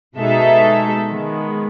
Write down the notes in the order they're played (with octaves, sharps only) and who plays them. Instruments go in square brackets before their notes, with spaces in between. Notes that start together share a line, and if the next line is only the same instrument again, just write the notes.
[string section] B2 G#3 D#4 A4 E5
D#3 G#3 B3